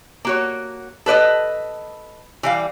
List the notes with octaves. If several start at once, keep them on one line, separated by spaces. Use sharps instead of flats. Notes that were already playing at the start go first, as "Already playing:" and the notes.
A#3 F#4 C#5
A4 B4 D5 D#5
E3 G3 F5